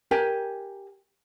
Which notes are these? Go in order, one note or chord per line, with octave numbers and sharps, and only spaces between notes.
G4 A#4 G5 G#5